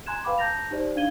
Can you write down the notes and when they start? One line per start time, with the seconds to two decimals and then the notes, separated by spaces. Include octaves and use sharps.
0.06 G#5 A#5 C6 F#6 G#6 E7
0.25 B4 F5 G5 B5 D6
0.38 A5 A#5 G6 A6 A#6 F7
0.71 D#4 G4 C5 D5
0.96 D4 D#4 F5 G#6 D#7 G7